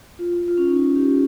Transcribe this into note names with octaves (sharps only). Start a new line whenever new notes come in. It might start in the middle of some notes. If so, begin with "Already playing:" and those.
F4
F4
C#4
D#4
F4
G4